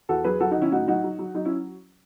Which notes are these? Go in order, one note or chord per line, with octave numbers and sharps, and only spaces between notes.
E2 F#4 A4
F#3 G#4 B4
F#3 F#4 A4
D#4 F#4
D#3 C#4 E4
A2 D#4 F#4
F#3 D#4 F#4
F#3
F#3
F#3 D#4
C#4 E4